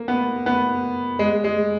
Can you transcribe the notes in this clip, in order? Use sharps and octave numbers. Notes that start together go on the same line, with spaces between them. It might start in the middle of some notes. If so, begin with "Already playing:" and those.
Already playing: A#3
B3
B3
G#3
G#3